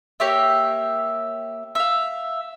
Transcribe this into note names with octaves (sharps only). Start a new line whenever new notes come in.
A#3 G4 C#5 E5
E5 F5